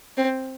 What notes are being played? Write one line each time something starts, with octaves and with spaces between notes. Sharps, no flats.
C4